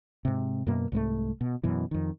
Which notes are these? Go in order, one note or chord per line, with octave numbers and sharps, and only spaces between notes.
G#2 C3
F#2 B2 A#3
C2 G#2 G#3 A3
B2
F#2 B2 E3
F2 D#3